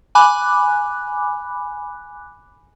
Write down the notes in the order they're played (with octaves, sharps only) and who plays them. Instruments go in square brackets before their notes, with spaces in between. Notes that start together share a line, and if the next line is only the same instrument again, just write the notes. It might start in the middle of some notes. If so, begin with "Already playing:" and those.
[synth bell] G#5 B5 D6 F#6